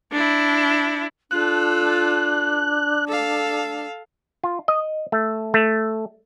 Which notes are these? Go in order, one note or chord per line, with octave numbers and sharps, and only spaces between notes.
D4 E4
D4 F4 A4 F#6
A4 F5
F4
D#5
A3
A3